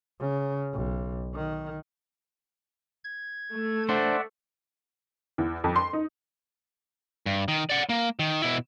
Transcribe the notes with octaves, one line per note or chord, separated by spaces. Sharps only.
C#3
B1
D#3
G#6
A3
D4 C5 D5 E5 F#5
E2
F2
C6
D#4
G2
D#3
D5 F#5
A#3
D#3
B2 E4